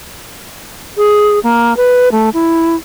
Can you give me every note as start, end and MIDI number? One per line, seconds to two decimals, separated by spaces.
0.97 1.39 68
1.43 1.76 58
1.77 2.09 71
2.12 2.29 57
2.34 2.76 64